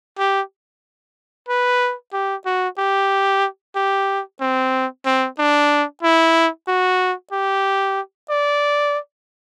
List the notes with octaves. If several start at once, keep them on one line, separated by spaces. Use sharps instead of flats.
G4
B4
G4
F#4
G4
G4
C4
C4
D4
E4
F#4
G4
D5